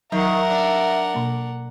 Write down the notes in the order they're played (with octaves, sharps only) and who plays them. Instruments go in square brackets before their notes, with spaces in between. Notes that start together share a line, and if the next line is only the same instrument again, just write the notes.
[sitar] D#3 [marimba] F#3 [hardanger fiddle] A#4 F#5 [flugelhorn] E5
[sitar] D4
[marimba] B2 A#3